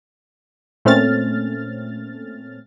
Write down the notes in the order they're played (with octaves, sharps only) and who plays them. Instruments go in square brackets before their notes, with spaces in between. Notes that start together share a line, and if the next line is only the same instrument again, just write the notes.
[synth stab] A#2 A3 C4 C#4 F6 A6